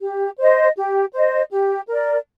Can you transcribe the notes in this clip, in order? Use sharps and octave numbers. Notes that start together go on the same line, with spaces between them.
G4
C5 D#5
G4
C5 D#5
G4
A#4 D5